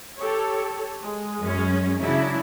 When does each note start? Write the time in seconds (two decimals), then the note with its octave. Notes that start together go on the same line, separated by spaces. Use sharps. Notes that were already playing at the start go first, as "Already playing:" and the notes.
0.19 G4 A4 C#5
1.02 G#3
1.39 F#2 C#4
2.02 C#3 F#3 D4 E4